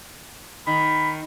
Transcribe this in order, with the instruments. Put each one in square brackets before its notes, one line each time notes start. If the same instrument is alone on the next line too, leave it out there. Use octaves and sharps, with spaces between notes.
[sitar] D#3 [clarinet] B5